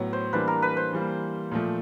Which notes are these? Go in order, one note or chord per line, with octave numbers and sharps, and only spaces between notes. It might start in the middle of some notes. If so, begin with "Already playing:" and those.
Already playing: A2 F#3 B3
C5
E3 G3 A#3 D4 B4
A#4
B4
C5
E3 G3 A#3
A#2 F3 A3